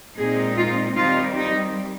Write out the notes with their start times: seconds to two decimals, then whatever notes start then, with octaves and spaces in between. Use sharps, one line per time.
0.17 A#2 G#3 C4 D#4 G#4
0.57 F4
0.97 D#3 G3 C4 D#4 F4
1.38 D#4